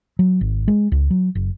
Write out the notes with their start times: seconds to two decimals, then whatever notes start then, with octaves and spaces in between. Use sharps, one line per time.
0.19 F#3
0.41 G#1
0.68 G#3
0.92 C#2
1.10 F#3
1.35 F#1